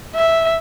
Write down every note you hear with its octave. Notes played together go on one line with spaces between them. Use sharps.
E5